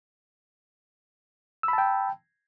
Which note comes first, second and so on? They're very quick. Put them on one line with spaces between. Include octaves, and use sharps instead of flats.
E6 B5 A5 G5